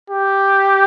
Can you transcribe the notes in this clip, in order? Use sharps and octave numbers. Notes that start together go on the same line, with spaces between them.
G4